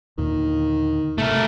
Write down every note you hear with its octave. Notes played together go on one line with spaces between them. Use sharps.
D#2 A#2 D3 D#3
A2 C3 A3 A#4